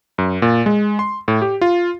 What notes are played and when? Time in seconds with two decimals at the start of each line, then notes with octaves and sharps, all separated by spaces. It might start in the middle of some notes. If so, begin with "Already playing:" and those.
0.18 F#2
0.42 A#2
0.66 G#3
0.99 C6
1.28 A2
1.42 G4
1.61 F4